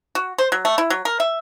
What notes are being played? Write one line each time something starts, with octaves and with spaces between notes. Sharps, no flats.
F#4
C5
F#3
A3
E4
F#3
A#4
E5